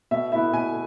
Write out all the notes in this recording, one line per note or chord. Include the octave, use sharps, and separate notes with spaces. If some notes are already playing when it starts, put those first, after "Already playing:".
B2 E5
B3 E4 E5
B2 G#5